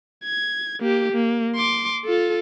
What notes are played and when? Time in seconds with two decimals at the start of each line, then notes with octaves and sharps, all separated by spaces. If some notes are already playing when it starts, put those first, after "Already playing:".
0.24 G#6
0.80 A#3 G4
1.12 A#3
1.56 C6 D6
2.05 F4 A4